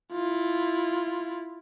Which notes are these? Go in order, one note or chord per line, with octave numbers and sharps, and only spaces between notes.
E4 F4